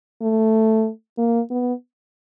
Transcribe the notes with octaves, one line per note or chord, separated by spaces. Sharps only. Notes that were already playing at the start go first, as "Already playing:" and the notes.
A3
A#3
B3